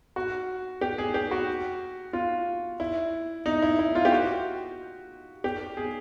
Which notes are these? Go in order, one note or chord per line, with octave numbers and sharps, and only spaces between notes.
F#4
G4
G#4
G4
F#4
F4
E4
D#4
E4
E4
F4
G4
F#4
G4
G#4